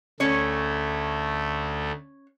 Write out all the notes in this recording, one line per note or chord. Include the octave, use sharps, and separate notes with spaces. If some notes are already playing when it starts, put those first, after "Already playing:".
D2 A3 C#4 C#5